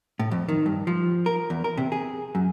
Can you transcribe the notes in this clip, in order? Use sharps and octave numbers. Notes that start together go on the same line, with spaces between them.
A2
F2
D#3
G2
F3
A#4
E2
A#4
C3
G#4
F#2